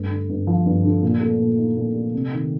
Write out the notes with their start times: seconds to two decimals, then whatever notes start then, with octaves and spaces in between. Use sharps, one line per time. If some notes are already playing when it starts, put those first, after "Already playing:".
Already playing: G2 A3
0.10 D3
0.29 G2
0.47 F3
0.66 G2
0.84 D3
1.02 A#2
1.20 A3
1.39 A#2
1.58 D#4
1.77 A#2
1.95 A3
2.13 C3
2.32 D#3